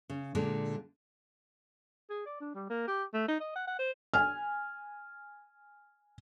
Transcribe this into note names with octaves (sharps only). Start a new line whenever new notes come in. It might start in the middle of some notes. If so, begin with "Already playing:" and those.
C#3
A#2 D3 G#3
G#4
D5
D4
G3
A#3
G4
A3
D#4
D#5
F#5
F#5
C5
G#5 F6